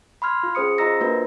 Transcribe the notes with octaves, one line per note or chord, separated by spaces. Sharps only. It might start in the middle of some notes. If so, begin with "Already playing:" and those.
B5 C6 F6 G#6
F4
C#4 G#4 C5 D#6 C#7
F4 C5 D#5 A#5 E6 A#6
A#3 D4 F#4 A#4 B4